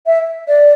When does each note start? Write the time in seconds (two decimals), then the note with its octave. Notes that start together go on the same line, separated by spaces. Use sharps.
0.06 E5
0.48 D5